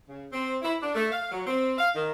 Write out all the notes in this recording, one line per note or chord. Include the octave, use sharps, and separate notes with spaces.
C#3
C4
E4
D4
A3
F5
F#3
C4
F5
D#3